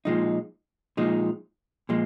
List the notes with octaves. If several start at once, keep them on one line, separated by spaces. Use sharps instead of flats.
A#2 F3 G#3 D#4
A#2 F3 G#3 D#4
A#2 F3 G#3